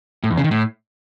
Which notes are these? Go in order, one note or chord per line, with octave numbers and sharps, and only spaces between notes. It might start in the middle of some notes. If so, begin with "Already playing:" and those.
A2
E2
C#3
D#3
A2